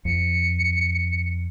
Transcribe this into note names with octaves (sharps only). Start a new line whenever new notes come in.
F2 C#7